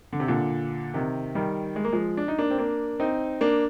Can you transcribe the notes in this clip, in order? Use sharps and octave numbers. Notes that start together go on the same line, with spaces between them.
D3
C3
A#2 D3
C3 D#3
D#3 G3
G#3
A#3
F3 G#3
D4
D#4
A#3 D4
C4
A#3 D4
C4 D#4
A#3 D4